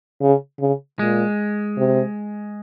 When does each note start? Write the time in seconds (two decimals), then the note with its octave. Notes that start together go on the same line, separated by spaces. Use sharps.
0.22 C#3
0.60 C#3
0.99 A#2 G#3
1.77 C3